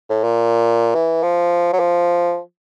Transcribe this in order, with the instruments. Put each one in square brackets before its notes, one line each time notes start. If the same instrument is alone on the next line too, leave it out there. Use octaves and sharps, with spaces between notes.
[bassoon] A2
A#2
E3
F3
F#3
F3